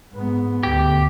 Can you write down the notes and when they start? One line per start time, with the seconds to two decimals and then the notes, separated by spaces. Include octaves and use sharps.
0.12 G#2 B3
0.63 D2 G4